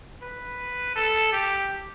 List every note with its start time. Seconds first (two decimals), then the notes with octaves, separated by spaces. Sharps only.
0.22 B4
0.95 A4
1.32 G4